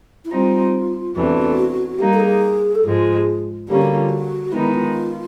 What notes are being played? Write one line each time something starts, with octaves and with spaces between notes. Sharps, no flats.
E4
G3 C4 D#4 F4
E2 C3 E3 A3 D4 F#4
G3 A#3 D#4 G4
A4
G#4
A4
G#2 F3 G#3 G#4
D3 G3 A#3 C#4 G4
F#4
F4
F#4
D#3 G#3 B3 D#4 E4
F4